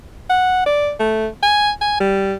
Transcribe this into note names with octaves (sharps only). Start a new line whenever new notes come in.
F#5
D5
A3
G#5
G#5
G3